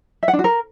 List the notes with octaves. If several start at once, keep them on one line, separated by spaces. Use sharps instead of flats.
E5
F#5
D4
F#4
A#4